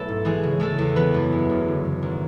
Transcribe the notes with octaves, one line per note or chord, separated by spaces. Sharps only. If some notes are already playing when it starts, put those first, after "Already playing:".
Already playing: B1 A3 B3 C#4 E4 A4 B4
G#2
E3 G#3 G#4
C#3
G#3 A3 A4
E2
E3 B3 B4
F#2
G#3
F#1
D3
F#2
G#1